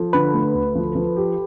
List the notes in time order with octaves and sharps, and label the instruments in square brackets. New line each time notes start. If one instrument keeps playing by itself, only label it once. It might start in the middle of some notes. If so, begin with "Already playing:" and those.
Already playing: [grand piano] F3 [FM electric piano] A4
[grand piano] D3 [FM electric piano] B4
[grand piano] A3
D2
F3
F3
G4